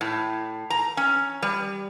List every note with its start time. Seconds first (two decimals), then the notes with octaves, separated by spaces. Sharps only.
0.01 A2
0.70 A#5
0.97 C#4
1.42 G3